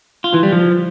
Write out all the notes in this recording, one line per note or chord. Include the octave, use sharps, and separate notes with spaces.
F4
E3
G3
F3